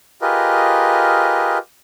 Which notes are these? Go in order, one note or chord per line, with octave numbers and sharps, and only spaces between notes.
F4 G4 G#4 A#4 B4 D#5